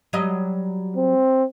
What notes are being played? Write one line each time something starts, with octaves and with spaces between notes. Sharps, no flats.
F#3 G3 D#5
C4